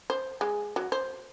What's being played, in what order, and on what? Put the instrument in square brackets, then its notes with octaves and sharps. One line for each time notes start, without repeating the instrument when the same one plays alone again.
[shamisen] C5
G#3
F#3
C5